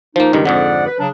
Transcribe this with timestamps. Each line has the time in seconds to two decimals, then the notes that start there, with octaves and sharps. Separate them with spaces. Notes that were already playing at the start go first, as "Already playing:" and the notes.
0.16 F3 A#3 D#4
0.33 C#2 G2 D#3
0.45 F2 G#2 D3 D5 F#5
0.85 B4
0.99 C#3 F#3 D4